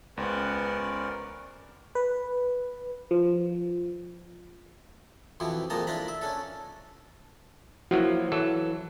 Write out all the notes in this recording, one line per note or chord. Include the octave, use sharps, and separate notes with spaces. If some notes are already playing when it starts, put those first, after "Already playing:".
C#2 B3 C#4 A#4 C5 D5
B4
F3
F2 B2 E3 F3 E4
F2 A#2 G#3 A#3 A5 A#5
D4 E4 F4 A#5 B5
E5
C#4 D4 A4
F3 F#3 A#3 E4 F#4
E3 F#3 A4